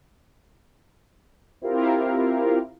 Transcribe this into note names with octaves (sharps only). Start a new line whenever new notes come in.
C4 E4 F4 G4 A#4 F5